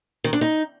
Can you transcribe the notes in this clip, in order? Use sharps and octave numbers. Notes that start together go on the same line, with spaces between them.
D#3
D4
D#4